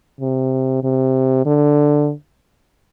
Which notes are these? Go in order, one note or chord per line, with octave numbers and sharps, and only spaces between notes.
C3
C3
D3